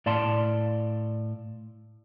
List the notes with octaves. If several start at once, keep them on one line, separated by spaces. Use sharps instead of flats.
A2 D5 F5 A5 C6